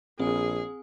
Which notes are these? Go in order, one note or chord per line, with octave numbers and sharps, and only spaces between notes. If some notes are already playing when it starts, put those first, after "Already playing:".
A#1 C4 G#4 G#5